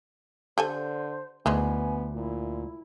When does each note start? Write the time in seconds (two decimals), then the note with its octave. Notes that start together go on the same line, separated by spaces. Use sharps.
0.58 D3 G4 A4 C5 G#5
1.46 D2 D#3 E3 G#3 B3 G#5
2.14 A#2 E4